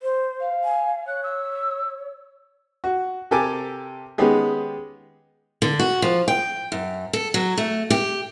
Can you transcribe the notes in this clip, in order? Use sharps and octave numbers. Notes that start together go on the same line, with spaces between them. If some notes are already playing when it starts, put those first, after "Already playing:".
C5
F5
G#5
C#5 F#6
E6
F#4
C3 G4 A4 A#4 G#5 D6
D#3 G#3 B3 C#4 G4 G#4
D3
F#4
F3
G5
F#2
A4
F#3
A3
G4